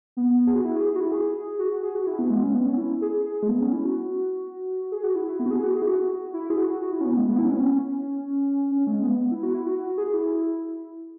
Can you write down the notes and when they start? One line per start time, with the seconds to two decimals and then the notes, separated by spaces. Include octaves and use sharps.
0.17 B3
0.47 G#4
0.55 F#4
0.65 E4
0.76 G#4
0.95 F#4
1.00 E4
1.12 G#4
1.59 F#4
1.71 F#4
1.83 G#4
1.95 F#4
2.07 E4
2.19 B3
2.30 G#3
2.42 C#4
2.54 B3
2.66 C#4
2.77 E4
3.01 G#4
3.25 G#4
3.43 G#3
3.49 B3
3.61 C#4
3.73 E4
3.85 F#4
4.92 G#4
5.03 F#4
5.15 E4
5.27 E4
5.40 B3
5.46 F#4
5.51 G#4
5.63 F#4
5.74 G#4
5.82 E4
5.87 F#4
6.34 E4
6.50 G#4
6.58 F#4
6.81 F#4
6.93 E4
7.01 C#4
7.05 B3
7.17 G#3
7.29 B3
7.39 E4
7.45 C#4
7.56 B3
7.60 C#4
8.71 C#4
8.87 G#3
9.03 B3
9.31 E4
9.43 F#4
9.54 E4
9.66 F#4
9.82 F#4
9.98 G#4
10.14 E4